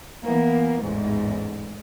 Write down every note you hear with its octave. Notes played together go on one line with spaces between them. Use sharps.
E3 A#3 B3
A1 E2 G#2